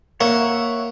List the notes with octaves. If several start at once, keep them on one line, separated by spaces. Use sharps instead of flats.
A#3 C#5 E5 F#5